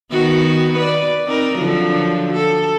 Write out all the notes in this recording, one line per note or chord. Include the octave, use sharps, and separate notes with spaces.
D#3 B3 F#4
B4 D5
C4 D#4 A#4
D3 F3 F#3
A4